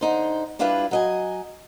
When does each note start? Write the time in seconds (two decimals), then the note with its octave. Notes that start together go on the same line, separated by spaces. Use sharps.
0.01 D3 D#4 C5
0.59 G3 D4 E4 F4 B4 E5
0.91 F#3 D#5 G#5